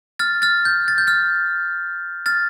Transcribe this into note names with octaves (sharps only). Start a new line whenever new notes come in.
F6 A6
F6 A6
G6
A6
G6
F6 A6
F6 A6